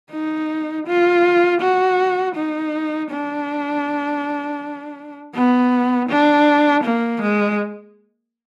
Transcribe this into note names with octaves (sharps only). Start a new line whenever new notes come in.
D#4
F4
F#4
D#4
D4
B3
D4
A#3
G#3